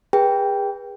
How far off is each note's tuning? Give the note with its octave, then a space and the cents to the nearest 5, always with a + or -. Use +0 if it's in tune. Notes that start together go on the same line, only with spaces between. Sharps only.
G#4 -35 B4 -30 G5 +0